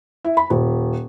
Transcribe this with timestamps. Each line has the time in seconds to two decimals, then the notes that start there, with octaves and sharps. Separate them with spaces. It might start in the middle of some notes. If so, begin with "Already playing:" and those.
0.24 E4
0.37 B5
0.50 D#1